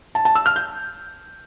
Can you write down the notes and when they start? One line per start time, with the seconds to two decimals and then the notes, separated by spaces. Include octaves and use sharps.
0.15 A5
0.25 A5
0.35 E6
0.46 F6
0.56 G6